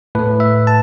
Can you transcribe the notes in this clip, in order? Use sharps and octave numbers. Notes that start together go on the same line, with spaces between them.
A2 A3 B4
E5
A5